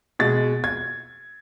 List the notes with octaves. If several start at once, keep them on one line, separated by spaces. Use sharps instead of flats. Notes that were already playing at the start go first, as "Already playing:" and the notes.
B2 G#3 A6
G#6